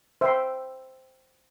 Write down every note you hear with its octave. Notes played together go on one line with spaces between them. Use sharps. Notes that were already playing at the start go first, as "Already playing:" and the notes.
C5 E5 G5 C6